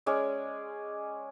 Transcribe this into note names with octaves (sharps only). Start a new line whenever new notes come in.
G#3 C#4 G#4 D5